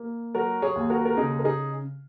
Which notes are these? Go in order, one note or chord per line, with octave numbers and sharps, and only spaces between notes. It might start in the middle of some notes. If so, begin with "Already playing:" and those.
Already playing: A#3
F#3 F#4 A#4
G#4 C#5
D#2
F#4 A#4
A#4
C#3 D#4 G#4
A#4
D#4 G#4